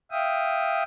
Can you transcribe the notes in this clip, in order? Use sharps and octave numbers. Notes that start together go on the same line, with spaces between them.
E5 F5 G5 D#6